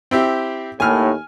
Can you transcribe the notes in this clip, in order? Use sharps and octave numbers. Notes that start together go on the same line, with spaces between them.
C4 E4 G4
D#2 A2 G#5 F6